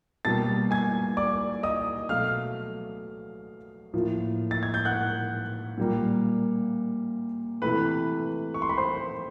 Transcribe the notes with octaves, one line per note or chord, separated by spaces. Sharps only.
B2 G3 A#3 A5 A6
G#5 G#6
D5 D6
D#5 D#6
B2 F#3 A3 F5 F6
A2 F3 A#3
A6
G#6
G6
F#5 F#6
A#2 G3 A#3
C3 E3 A3 B4 B5
C#6
C6
B5
C5 C6